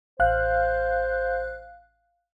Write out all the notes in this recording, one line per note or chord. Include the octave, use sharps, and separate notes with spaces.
A1 C5 F5 F#6